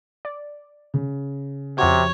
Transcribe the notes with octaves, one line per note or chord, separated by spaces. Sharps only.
D5
C#3
F2 C3 F#4 C#5